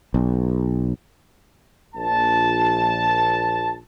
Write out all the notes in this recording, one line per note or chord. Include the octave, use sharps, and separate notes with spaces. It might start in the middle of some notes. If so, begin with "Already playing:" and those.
B1
A#1 A5